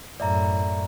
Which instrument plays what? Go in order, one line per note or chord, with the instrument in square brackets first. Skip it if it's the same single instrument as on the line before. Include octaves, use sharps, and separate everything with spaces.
[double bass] F#2 A2 [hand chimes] D5 E5 A#5